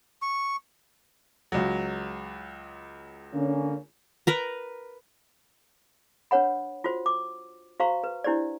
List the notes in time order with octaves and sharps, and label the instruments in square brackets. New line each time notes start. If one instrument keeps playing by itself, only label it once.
[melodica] C#6
[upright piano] C#2 F#3
[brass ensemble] D3 A#3 C#4
[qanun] A#4 B4 A#5
[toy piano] D4 B4 C#5 F#5 B5
F4 F#4 C5
D6
F#4 C5 F5 A#5 C#6
B4
D4 E4 G4 C5 D5